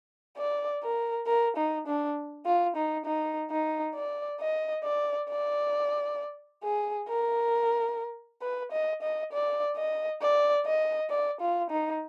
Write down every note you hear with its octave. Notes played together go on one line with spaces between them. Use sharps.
D5
A#4
A#4
D#4
D4
F4
D#4
D#4
D#4
D5
D#5
D5
D5
G#4
A#4
B4
D#5
D#5
D5
D#5
D5
D#5
D5
F4
D#4